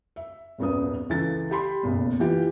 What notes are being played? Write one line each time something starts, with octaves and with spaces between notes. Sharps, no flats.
E5
D#1 G#1 F#2 B3 D#6
C#2 E3 A4 A6
G4 B5 C6
F#1 B1 E2
E3 F4 G4